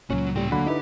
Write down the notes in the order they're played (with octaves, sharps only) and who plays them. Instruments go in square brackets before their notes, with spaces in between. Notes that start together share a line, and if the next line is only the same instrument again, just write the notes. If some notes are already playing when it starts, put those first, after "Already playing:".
[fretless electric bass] C#2 A#2 [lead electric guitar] F#3 F#4 [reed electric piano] C#4
[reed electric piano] A2 G3 [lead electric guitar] C#4 G5
[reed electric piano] D2 F#3 [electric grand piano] D3 F#5 B5 [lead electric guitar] A#3
[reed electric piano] D#4 E4 B4 [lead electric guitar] G4